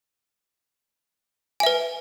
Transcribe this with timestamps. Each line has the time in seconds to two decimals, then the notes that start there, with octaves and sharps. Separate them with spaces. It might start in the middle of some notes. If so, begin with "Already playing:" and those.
1.60 G#5
1.63 E5
1.66 B4